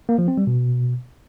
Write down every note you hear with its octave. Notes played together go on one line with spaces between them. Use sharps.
A#3
F3
C4
G3
B2